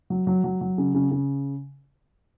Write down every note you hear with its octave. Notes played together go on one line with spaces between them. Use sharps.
F#3
F#3
F#3
F#3
C#3
C#3
C#3